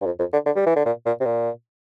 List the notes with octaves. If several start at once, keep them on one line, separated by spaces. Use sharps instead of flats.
G2
F2
F2
D3
D3
G3
E3
D3
A#2
A#2
C3
A#2